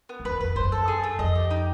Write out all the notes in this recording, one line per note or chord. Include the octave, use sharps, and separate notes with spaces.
B3
F2
E2 B4
F2 B4
F#2 C5
A4
G#4
A3
F2 D#5
G4
D#4